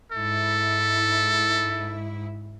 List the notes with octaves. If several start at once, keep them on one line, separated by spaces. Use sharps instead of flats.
G#2 E4 A4